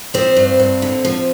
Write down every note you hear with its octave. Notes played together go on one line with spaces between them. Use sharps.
F3 C4 C5
G2
G2
D3
F3